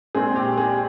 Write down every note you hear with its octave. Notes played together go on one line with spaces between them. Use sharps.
A#1 A#2 G#3 C4 G#4
G4
G#4